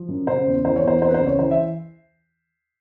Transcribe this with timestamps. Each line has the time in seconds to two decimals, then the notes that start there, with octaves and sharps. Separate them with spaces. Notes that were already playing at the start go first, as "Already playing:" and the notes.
Already playing: F3
0.08 F#2
0.27 C#3 C5
0.46 E2
0.64 E3 C5
0.76 C#5
0.83 E2 C5
1.02 C3 C5
1.09 B4
1.14 C5
1.21 C#2
1.27 C#5
1.39 E3 C5
1.51 E5